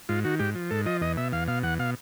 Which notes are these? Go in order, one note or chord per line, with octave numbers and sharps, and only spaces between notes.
G#2 F4
D#3 F#4
G#2 G4
F3
G#2 A4
F3 D#5
E2 D#5
B2 E5
E2 F5
B2 F5
E2 F#5
B2 F5